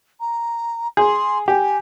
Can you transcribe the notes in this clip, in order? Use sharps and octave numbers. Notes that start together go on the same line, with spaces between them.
A#5
G#4 C6
G4 G#5